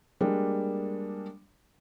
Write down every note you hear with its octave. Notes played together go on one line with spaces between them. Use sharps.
G3 G#3 A#3 D4